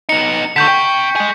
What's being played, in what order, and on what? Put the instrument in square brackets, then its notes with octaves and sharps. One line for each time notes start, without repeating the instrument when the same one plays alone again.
[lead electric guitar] B3 D#4 [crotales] C#7
[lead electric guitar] D3 A3 [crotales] C#6 G6 B6
[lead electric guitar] C3 G5
G#4 D#5